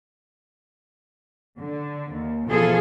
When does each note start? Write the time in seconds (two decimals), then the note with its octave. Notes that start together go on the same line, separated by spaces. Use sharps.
1.58 D3
2.11 D#2
2.47 B2 E3 F3 F4 G#4 A4